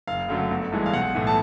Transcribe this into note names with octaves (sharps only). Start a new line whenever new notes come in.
F#1 F5
F#2 D3 F#3 A3
G1
G2 E3 G#3
F5
B1 F#5
A2 E3
A5